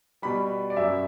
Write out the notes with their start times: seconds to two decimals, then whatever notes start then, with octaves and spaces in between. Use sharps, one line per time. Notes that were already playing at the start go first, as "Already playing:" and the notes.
0.22 B2 G3 B5
0.70 D5
0.76 F#2 F#3 E5